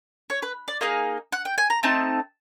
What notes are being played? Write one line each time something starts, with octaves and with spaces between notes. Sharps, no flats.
C#5
B4
D5
A#3 D#4 G#4 D#5
F#5
G5
G#5
A#5
A3 C4 D#4 A5